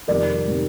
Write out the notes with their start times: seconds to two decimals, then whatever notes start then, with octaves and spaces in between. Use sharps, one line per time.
0.08 F2 C3 D#3 G3 A#4 D5
0.48 C3 D#3 G3